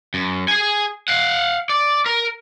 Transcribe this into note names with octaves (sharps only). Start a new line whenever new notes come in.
F#2
G#4 G#5
F5 F#5
D5
A#4